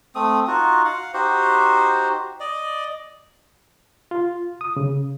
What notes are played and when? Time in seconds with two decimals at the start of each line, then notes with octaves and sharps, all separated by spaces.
0.15 A3 C4 D#6
0.47 D#4 F4 F#4
0.85 F5 F#5
1.14 D#4 F#4 G4 C5
2.40 D5 D#5
4.11 F4
4.61 D#6
4.77 C#3